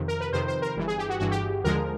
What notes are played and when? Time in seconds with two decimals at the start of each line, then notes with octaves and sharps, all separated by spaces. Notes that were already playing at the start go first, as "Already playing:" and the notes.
Already playing: F2 C3 D#3
0.08 A#4
0.21 B4
0.33 F2 C3 D#3 C5
0.48 C5
0.62 A#4
0.76 G1 G2 E3
0.88 G#4
0.99 G4
1.10 F#4
1.20 G1 G2 E3 F#4
1.31 G4
1.64 D#2 D3 F3 G#3 A#4